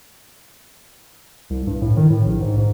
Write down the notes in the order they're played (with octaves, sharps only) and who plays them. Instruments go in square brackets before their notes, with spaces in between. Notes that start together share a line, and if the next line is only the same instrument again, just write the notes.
[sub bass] C2
G2
A2
D#3
A2
A#1
G#2
G#2